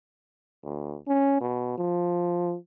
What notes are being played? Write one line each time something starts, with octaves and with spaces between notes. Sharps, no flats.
D2
C#4
B2
F3